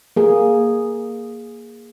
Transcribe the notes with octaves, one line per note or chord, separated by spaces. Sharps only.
A#3 G#4